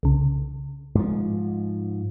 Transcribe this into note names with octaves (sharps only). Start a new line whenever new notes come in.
C2 C#3
G#2 F3